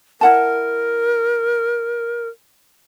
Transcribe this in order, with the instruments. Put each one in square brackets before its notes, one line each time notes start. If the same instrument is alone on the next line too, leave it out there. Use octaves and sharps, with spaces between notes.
[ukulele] E4 F#5 A5 [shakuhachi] A#4